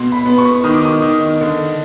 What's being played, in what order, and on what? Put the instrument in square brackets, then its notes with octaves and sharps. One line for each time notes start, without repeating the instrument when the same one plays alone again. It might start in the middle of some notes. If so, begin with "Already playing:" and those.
Already playing: [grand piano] B2 B3 C6
B5
B3
C#6
D#3 D#6
D6
D#6
D#3
D3